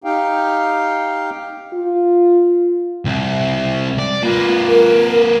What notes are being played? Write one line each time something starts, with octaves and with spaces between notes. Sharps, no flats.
D#4 G4 F5 G5
F4
C2
D5
A#3 F4 B4
A#4